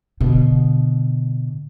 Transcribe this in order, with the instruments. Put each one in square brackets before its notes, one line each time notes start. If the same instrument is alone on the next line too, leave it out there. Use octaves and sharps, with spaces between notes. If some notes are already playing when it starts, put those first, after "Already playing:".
[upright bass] B2 D3